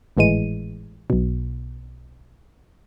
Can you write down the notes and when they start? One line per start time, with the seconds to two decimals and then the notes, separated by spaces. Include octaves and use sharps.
0.17 G#1 A2 E3 G#3 D#7
1.10 B1 B2